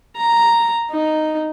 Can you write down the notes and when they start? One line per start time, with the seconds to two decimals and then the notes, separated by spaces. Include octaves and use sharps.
0.16 A#5
0.91 D#4